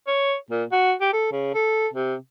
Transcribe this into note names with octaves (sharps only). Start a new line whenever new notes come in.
C#5
A#2
F#4
G4
A4
C#3
A4
C3